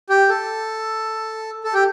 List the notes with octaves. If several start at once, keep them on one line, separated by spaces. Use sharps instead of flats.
G4
A4
A4
G4